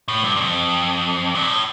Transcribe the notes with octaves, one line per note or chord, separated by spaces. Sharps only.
A2
G2
G2
F2
G2
A#2
A2